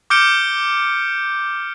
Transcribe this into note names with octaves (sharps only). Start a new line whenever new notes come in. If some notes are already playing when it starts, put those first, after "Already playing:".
D6 F6 G6 C#7 D7 G7